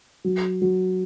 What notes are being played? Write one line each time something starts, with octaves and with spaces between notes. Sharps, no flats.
F#3
F#3